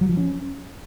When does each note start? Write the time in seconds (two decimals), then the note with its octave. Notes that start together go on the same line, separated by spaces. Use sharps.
0.01 F#3
0.09 F3
0.17 C#4